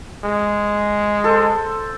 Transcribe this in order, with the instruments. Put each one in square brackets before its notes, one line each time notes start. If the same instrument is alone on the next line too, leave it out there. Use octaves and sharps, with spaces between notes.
[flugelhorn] G#3
[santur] A4 C5